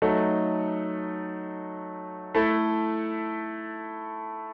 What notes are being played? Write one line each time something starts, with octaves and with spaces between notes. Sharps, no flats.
F#3 A3 D#4 A4
A3 E4 A4